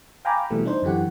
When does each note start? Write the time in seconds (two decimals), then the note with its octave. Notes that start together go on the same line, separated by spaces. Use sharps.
0.25 F5 G5 G#5 A#5 B5 D6
0.50 B2 E3 G3 A3
0.65 D4 D#4 C5
0.82 F#2 D3 E3 G4 F#5